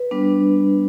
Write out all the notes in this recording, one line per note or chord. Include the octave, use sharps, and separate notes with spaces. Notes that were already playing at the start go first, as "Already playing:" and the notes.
Already playing: B4
G3 B3 D4